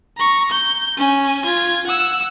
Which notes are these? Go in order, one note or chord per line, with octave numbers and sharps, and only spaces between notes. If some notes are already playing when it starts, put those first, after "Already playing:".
A#5 C#6
G6
C#4 G#5
F4 G#6
F#5 E6